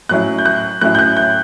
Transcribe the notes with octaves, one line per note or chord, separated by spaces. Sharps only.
A2 F#3 C#4 E4 F#6
G6
F#6
A2 F#3 C#4 E4 F#6
G6
F#6
G6